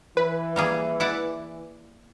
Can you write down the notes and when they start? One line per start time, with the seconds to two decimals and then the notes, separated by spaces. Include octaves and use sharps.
0.17 E3 B4
0.56 G3 A#3 G#4
1.00 E4 D5 F#5